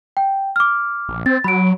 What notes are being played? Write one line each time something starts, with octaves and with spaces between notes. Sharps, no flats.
G5
D6 F6
A#1
C4 A6
F#3 B5 D7